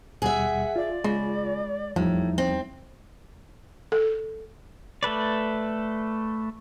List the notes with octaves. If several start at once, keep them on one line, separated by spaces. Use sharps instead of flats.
D#2 B2 G3 G#4 E5 F#5
F4 D5
C#3 G#3
E2 A2 F3 G3 D#4
C4
A4
A3 A4 B4 D5